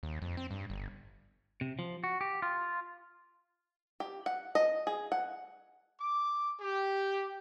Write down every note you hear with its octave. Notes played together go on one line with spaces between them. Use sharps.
D#2
F2
C4
G2
G1
C3
F3
F#4
G4
F4
G4
F#5
D#5
G#4
F#5
D6
G4